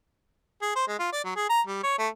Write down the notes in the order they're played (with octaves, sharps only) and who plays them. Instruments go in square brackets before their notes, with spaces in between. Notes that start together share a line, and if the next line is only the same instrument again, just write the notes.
[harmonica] G#4
C5
G#3
F4
D5
F#3
G#4
A#5
G3
C#5
A3